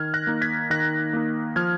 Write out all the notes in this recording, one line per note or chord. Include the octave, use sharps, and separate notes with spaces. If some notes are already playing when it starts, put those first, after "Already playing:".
Already playing: D#3 F6 G#6
F#6 A#6
A#3 D#4
G#6 B6
D#3 F#6 A#6
A#3 D#4
F3 F6 G#6